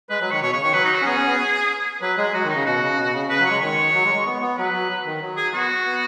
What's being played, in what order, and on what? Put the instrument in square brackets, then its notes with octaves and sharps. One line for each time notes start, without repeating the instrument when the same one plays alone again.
[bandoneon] G#3 [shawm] B4
[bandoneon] F#3 [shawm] B4
[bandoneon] D#3 [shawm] C#5
[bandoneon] B2 [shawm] C#5
[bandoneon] C#3 [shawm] C#5
[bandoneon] D#3 [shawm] C#5
[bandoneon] F#3 [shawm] B4
[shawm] D#4
F#4
[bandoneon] C#4
[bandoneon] B3 [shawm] G#4
[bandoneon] C#4
B3
[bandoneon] F#3 [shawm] B4
[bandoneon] G#3 [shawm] G#4
[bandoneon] F#3 [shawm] F#4
[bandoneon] D#3
[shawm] D#4
[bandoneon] C#3
[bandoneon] B2 [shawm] F#4
[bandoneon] C#3
B2
C#3
[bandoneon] C#3 [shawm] B4
[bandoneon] F#3
[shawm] C#5
[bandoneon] G#3
[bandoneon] D#3 [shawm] C#5
[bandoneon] F#3
G#3
G#3
B3
B3
[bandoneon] F#3 [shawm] B4
[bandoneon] F#3
D#3
F#3
[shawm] G#4
[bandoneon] B3 [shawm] F#4
[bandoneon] B3